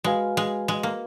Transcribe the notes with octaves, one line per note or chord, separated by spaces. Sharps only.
G#3 F#4 B4 F5 G#5
G#3
G#3
A#3